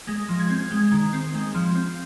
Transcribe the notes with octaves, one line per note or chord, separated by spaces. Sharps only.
G#3 A#6
F3
G#6
C4
G#3
D#3
C4
G#3
F3
C4